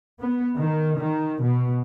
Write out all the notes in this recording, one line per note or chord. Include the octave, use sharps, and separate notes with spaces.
B3
D#3
D#3
B2